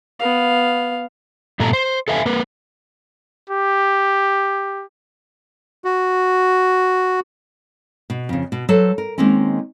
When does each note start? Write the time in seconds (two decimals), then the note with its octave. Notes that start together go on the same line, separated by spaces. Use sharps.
0.19 B3 F5
1.60 G2 A#2 A3 B3 A4 A#5
1.73 C5
2.08 A4 B4 E5 F5 G#5
2.26 A#3 A#4 B4
3.50 G4
5.85 F#4
8.10 B2
8.29 F2 C#3
8.52 B2
8.69 F#3 A4 B4 C5
8.98 A#4
9.18 D#3 G#3 A#3 C4 C#4